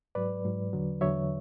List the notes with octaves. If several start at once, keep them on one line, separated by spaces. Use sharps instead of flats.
G#2 F#3 B4 D5
G#2 F#3
E2 D3 F#3
E2 D3 F#3 C#5 E5